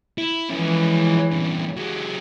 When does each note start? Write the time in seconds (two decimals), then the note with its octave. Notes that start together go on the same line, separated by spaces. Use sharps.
0.18 E4
0.50 E3 F3 G#3 C#4
1.31 E2 G2
1.76 F#3 G#3